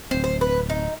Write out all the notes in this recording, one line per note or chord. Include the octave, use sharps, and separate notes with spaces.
D1 C4 C5
C5
B4
D#4